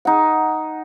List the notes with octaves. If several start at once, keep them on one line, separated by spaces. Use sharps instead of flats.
D#4 F#5